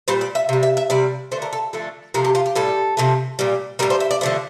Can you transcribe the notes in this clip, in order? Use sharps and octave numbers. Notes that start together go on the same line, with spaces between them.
A#2 G3 C5
D5
E5
C3 G3
E5
E5
C3 G3 D5
D3 A3 C5
A#4
A4
D3 F3 A3 A4
C3 F3 A3 A#4
G4
F4
G4
A2 G3 A4
C3 F3 A3
A#2 G3
A2 G3 A#4
C5
E5
D5
D3 F3 A3 C5